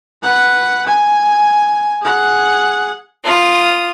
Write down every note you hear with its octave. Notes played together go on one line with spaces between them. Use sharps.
B4 F#5
G#5
G#4 F#5
F4 D#6